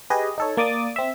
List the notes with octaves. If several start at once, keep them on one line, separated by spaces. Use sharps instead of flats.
G4 G#4 B4 D#5
D#4 A4 C#5
A#3 D5 D6 D#6 A6
C4 E5